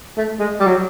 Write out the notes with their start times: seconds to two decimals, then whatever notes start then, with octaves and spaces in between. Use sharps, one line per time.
0.17 A3
0.39 G#3
0.60 G3
0.67 F#3